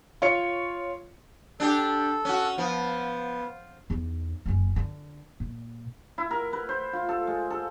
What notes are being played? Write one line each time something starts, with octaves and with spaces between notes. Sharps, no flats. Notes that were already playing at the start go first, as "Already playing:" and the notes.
F4 C#5 C#7
D4 G4 A4
C#4 F#4
F3 B3
E2 D#4
F#1 C#4
D3
A#2
E4
A#4
B4
C5
F4
A4
G#3
A4